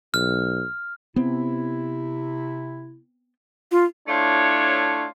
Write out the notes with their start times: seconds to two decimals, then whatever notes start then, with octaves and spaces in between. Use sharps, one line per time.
0.14 B1 F6
1.16 C3 B3 C4 E4
3.71 F4
4.08 A3 D4 E4 F4 C#5